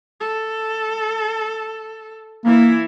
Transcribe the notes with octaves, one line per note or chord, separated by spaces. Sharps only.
A4
E3 A#3 E4